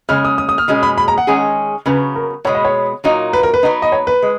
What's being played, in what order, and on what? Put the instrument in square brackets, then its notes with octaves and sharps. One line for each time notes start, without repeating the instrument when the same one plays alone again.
[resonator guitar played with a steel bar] C#3 G#3 C#4 [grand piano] F6
[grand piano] D#6
D#6
D#6
F6
[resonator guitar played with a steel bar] B2 G#3 C#4 G#4
[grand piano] B5
B5
A#5
F#5
[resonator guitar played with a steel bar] D#3 G#3 C#4 G#4
[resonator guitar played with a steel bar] C#3 F#3 B3 [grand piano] B4
[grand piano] A#4
[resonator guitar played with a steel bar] B2 G#3 B3 [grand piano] C#5
[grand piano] D#5
C#5
[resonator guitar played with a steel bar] A#2 F#3 A#3 D#4
[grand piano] B4
A#4
B4
[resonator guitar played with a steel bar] F#3 B3 D#4
[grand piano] D#5
C#5
B4
[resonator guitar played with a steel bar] G#3